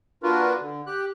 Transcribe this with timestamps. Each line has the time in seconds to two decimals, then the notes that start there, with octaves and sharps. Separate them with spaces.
0.23 A#2 D4 F4 F#4 A#4 B4
0.61 D3
0.87 G4 F#6